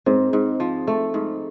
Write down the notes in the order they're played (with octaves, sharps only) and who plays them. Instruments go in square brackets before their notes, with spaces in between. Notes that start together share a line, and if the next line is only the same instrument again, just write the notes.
[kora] G#2 [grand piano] C4
[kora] G#2
F3
A3
G#2